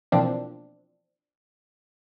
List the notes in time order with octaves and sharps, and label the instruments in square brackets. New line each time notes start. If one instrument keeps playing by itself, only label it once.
[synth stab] B2 E3 F3 A#3 C4 D4